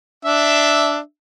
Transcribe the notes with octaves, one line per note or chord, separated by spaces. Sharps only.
D4 E5